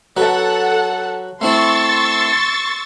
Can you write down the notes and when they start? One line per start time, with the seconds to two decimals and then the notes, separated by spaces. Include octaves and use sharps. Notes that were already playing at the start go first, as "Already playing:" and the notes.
0.17 F#3 A4 B4 F#5
1.41 A3 C4 E4 C6 C#6 E6 A6